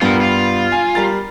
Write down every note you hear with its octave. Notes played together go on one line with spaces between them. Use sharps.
G2 G3 B3 F4 A#4
F4
G#5
G3 A#4 A6